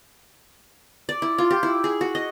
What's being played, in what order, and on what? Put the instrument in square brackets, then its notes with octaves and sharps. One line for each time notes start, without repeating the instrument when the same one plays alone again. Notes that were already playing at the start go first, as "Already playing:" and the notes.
[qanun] D5
E4
F4
G4
E4
G#4
F#4
D#5